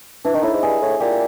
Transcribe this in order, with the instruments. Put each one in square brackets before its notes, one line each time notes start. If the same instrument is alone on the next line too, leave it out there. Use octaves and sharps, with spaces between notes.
[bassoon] E3 [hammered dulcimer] D4
[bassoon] D#3 [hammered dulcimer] D#4
[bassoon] A2 [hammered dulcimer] E4
[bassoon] G#2
[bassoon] G2 [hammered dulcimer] G#4
[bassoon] A2
[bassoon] A#2 [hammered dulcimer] G4